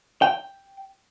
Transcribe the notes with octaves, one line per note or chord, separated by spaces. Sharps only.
G5